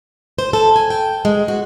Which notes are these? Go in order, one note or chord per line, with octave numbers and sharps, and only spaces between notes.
C5
A4
G#5
G5
G#3
F#4